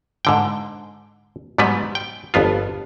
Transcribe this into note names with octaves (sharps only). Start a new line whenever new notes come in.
G#2 D3 G5
G#2 F#3 G3 B3 B4
G5
G1 F2 B3 F4